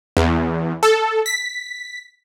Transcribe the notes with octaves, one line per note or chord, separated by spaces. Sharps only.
E2
A4
B6